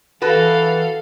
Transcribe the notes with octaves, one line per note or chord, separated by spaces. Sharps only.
E3 F#4 A4 B4 F5